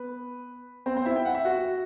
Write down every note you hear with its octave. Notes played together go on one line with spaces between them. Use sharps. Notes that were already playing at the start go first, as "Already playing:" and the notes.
Already playing: B3 B4
C4 C5
C4 C5
E4 E5
G5
F#5
E5
F#4 F#5